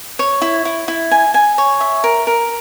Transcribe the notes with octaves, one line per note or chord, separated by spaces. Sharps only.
C#5
E4
E4
E4
G#5
G#5
C#5
E5
A#4
A#4